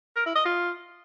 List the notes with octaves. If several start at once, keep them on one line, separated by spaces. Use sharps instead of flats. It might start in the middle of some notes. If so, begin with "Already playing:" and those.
A#4
E4
D#5
F4